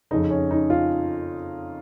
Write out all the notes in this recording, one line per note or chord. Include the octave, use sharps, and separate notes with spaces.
F2 C#3 D#4
C#4
D#4
F4